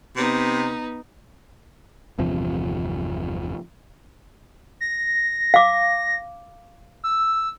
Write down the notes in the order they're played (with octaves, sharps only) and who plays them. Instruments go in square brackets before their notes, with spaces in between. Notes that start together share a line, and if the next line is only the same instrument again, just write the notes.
[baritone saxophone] C3 [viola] B3 D#4
[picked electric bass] G1 E2 C3 F3
[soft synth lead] A#6
[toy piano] F5 D6
[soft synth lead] E6